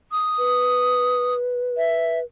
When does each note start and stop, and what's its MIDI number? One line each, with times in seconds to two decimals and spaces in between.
0.12 1.34 87
0.38 2.24 71
1.77 2.19 76